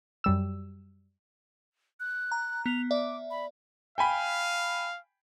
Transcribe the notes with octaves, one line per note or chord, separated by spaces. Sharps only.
F#2 G3 E6
F#6
A#5
B3 F7
D5 E5 D6
B5
F5 G5 G#5 B5